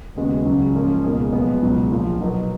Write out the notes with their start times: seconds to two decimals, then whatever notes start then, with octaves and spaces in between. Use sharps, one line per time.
0.16 D#2 C#3 G#3 B3 F#4
0.45 C#2 C#3 F#3 C#4
0.74 G#2 F3 A#3 C#4
1.04 C#2 B2 A#3 D#4 G#4
1.32 B1 A#2 F3 G#3 B3
1.62 C#2 B2 F#3
1.91 A#1 A#2 F3
2.20 B2 F#3 B3 D#4 A#4